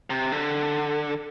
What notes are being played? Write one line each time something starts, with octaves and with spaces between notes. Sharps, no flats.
C3
D3